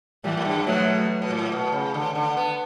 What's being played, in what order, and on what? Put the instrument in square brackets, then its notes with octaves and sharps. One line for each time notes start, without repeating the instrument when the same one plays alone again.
[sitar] A2 [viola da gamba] E3 G3
[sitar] A2
G2
[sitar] B2 [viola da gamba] F#3 A3
[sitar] B2
B2
A2
B2
C#3
D3
D3
B3